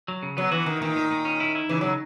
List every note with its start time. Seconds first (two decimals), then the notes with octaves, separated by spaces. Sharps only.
0.08 F#3
0.23 C#3
0.37 F#3 B3
0.52 E3 F#4
0.66 D#3 E3
0.81 A#2 D#3
0.96 A#2
1.11 A#2
1.25 C#4
1.40 E4
1.55 E4
1.69 C#3 E3
1.81 C#3 F#3